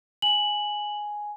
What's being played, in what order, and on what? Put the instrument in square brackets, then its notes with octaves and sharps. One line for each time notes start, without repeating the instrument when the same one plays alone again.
[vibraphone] G#5 [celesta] F#7